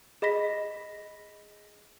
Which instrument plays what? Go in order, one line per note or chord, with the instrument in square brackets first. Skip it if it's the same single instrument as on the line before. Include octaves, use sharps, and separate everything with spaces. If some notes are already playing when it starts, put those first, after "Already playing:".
[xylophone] G#4 D#5 B5 A#6 B6